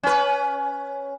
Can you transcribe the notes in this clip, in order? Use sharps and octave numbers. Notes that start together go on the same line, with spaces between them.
C#4 B4